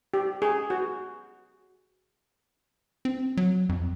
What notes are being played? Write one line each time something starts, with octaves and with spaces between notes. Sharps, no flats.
G4
G#4
F#4
C4
F#3
F2